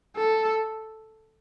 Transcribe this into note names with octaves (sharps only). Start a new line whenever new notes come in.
A4